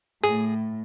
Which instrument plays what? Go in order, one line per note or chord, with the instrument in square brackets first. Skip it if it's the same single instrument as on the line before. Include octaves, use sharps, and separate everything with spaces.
[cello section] A2 [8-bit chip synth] G#4